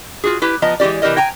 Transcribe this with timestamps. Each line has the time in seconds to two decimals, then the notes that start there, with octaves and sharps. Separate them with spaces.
0.24 F4 F#4 G#4
0.42 E4 G4 B4
0.62 F3 B3 D#5 A#5
0.80 E3 G#3 F4 G4 D5
1.02 C3 E3 F4 G4 A#4 D#5
1.17 G5 G#5 A#5